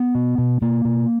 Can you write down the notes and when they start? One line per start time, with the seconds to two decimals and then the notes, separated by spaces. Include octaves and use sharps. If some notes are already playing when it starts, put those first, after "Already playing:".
Already playing: B3
0.15 B2
0.38 B2
0.62 B2 A#3
0.85 B2